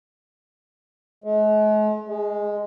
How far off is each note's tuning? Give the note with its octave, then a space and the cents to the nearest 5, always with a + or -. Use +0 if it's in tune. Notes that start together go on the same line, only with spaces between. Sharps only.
G#3 +45
G#3 -5